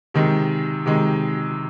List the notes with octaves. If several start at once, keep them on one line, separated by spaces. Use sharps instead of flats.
C3 D#3 G#3
C3 D#3 G#3